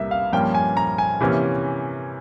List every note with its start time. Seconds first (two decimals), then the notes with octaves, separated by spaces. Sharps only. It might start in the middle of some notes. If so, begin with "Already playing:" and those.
Already playing: C2 C3 G3 A#3 E5
0.11 F5
0.33 G2 F3 A#3 C#4 G5
0.55 G#5
0.77 A#5
0.98 G#5
1.21 C3 E3 A#3 C#4